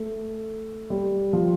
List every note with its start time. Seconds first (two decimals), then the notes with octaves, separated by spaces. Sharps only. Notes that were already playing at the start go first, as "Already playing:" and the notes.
Already playing: A3
0.90 G3
1.33 F3